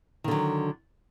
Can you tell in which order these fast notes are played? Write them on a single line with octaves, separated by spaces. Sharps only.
D#3 D3 F#3